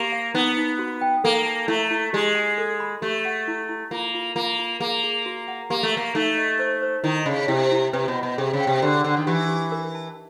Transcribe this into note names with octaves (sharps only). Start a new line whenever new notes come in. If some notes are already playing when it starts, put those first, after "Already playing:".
Already playing: A#3 G4
F5
B3 D#4
D#4
F#4
G5
A#3 A4
A5
A3 E4
E4
G#3 G4
G#5
A4
B5
A3 G4
F#5
E4
E4
A#3 F4
F4
A#3 F4
F4
A#3 G#4
G#4
F#4
F#5
A#3 G4
A3
A#3 F5
A3 D#4
D#5
C5
C5
D#3 E4
C#3 D#5
C3 E4
E4
C3 B4
B2
B5
B2
C3 G#4
C#3
G5
C3
D3 G4
D3 F#5
D#3
E3 G4
G4
A#4
A5